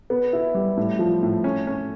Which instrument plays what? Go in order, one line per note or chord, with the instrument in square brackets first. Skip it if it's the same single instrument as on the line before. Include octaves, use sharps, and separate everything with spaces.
[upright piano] B3
E4
G3
A2
F3
A2
C#4
C#4